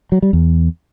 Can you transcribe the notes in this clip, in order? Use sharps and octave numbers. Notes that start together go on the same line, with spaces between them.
F#3
G3
E2